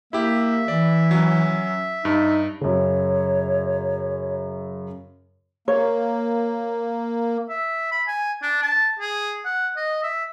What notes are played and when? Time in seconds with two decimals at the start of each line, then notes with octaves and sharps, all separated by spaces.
0.13 A#3 E4 G4 E5
0.68 E3 D5
1.11 F#3 C#4
2.05 G2 D#4
2.61 F#2 C#3 C#5
5.68 A#3 C#5
7.49 E5
7.92 B5
8.08 G#5
8.42 D4
8.62 A5
8.99 G#4
9.45 F#5
9.77 D#5
10.03 E5